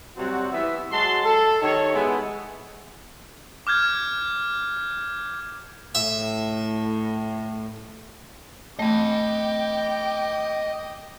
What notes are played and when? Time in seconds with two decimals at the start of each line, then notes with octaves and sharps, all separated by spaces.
0.16 C3 F#3 G3 C4 F#4
0.52 E3 B3 E5
0.91 F#3 G#3 F#4 A5 C6
1.25 A4
1.62 D#3 D#4 G4 C#5
1.93 G#3 B3 E4
3.67 D6 F6 G6 G#6
5.95 A2 E5
8.79 E3 A3 D#5 G5 B5 D6